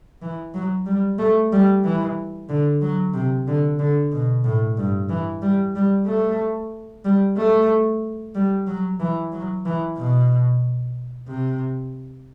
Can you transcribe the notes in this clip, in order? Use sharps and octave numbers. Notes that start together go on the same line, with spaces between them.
E3
F#3
G3
A3
G3
E3
D3
F#3
C3
D3
D3
B2
A2
G2
E3
G3
G3
A3
G3
A3
G3
F#3
E3
F#3
E3
B2
C3